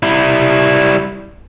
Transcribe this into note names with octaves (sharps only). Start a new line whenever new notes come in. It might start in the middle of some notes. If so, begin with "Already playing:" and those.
G3 E4